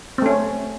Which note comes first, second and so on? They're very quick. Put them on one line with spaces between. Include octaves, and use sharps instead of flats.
C4 A3 C#4